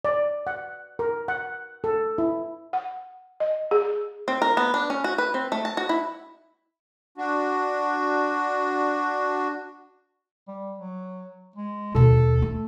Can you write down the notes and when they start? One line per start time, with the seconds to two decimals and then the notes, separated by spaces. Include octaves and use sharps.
0.05 D5
0.47 F#5
0.99 A#4
1.28 F#5
1.84 A4
2.18 E4
2.73 F#5
3.40 D#5
3.71 G#4
4.28 C4
4.42 A#4
4.57 B3
4.74 D4
4.90 C#4
5.04 F#4
5.18 B4
5.34 C4
5.52 A3
5.65 A5
5.77 F#4
5.89 E4
7.18 D4 F#4
10.48 G3
10.78 F#3
11.56 G#3
11.95 D#2 B2 A4
12.42 A3